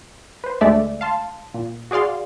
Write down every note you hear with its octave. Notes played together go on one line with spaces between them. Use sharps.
B4 C5
D2 G#3 A3 D5 E5
F5 A5 C6
A#2
F#4 G#4 D5 F5 C6